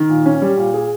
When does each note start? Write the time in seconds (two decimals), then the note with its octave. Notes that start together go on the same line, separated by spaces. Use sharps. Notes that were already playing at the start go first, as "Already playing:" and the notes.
Already playing: D#3
0.09 A#2
0.26 C#4
0.42 G3
0.58 A#2
0.74 G#4